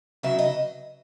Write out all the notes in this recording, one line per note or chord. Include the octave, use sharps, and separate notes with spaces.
C#3 F#3 E5
D#5